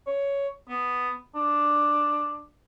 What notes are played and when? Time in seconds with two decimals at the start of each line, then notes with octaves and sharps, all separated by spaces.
0.06 C#5
0.68 B3
1.35 D4